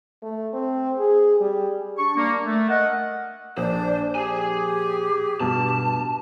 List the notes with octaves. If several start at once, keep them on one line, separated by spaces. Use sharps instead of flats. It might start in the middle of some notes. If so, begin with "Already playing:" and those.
A3
C4
G#4
G3
D4 C#6
G3 A#3
A3
A#4 D#5 F#5
A#1 D4 C5
G4 G#4 G#5
G2 B2 A5